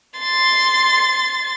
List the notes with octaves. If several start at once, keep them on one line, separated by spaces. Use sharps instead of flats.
C6 A6